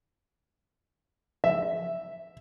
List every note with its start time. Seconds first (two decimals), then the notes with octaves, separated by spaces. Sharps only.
1.44 E5